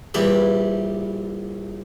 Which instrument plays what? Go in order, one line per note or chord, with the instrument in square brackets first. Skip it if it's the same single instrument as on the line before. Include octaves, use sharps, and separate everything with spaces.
[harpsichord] A#1 G3 D5 [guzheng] E3 G4